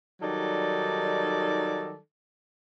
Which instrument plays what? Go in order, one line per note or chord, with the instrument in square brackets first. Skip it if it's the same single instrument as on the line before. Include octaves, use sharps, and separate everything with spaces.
[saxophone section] D#3 F#3 G3 D#4 A4 D5